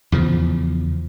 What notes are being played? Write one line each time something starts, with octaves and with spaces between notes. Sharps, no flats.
E2 C#3 F3